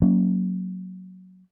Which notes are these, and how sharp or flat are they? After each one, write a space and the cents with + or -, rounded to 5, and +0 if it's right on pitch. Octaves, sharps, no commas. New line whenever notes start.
F#3 +0 A#3 +0 C#4 +0